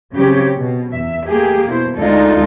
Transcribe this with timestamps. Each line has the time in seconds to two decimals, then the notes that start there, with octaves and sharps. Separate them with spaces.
0.13 C#3 F#3 C4 G4 C#5
0.57 B2
0.94 E2 E5
1.27 A3 A#3 G4 G#4
1.68 B2 E4 C5
1.98 D2 G#3 D4 D#4 F4 A4